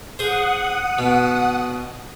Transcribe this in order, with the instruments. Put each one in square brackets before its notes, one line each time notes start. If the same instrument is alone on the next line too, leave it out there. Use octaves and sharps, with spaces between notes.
[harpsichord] G#4 C5 [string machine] F#5 D#6
[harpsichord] B2